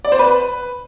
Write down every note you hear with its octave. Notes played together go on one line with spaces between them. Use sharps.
D5
C5
B4